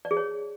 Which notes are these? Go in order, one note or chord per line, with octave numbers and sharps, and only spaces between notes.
D5
G#4
C#5